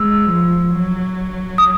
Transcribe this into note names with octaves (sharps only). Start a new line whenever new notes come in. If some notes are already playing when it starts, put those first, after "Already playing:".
Already playing: G#3 E6
F3
F#3
D#6